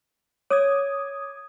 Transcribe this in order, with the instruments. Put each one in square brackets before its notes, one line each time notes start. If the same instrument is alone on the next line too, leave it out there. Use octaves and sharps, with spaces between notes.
[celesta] C#5 D#7 [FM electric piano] D6 D#6 G#6